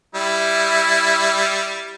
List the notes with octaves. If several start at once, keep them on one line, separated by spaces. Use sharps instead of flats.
G3 E4